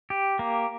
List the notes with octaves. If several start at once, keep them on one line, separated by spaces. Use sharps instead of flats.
G4
A#3